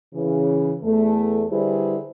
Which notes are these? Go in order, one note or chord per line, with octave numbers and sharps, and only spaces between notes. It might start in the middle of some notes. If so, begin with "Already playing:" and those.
C#3 E3
E2 A3
D3 G3 E4 G#4 B4 C5